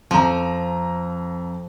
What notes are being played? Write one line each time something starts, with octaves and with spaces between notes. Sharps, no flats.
F2 F3 A#5